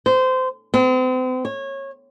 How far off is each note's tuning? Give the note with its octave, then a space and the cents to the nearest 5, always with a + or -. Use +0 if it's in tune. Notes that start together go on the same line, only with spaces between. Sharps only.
C5 -20
C4 -40
C#5 -20